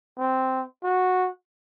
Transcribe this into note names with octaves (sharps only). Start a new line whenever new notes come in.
C4
F#4